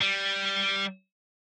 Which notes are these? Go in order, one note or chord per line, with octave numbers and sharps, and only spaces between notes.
G3